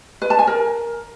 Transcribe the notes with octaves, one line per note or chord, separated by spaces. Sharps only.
B4
A5
G#5
A#4